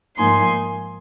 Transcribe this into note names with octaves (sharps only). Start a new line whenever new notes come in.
G#2 F3 A#3 D#4 G#5 C6